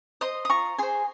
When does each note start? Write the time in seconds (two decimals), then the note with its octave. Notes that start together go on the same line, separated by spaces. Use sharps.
0.21 C5 D#5 C6 D#6
0.45 D#6
0.50 F4 A#5 C#6
0.78 G#4 C5 G#5 C6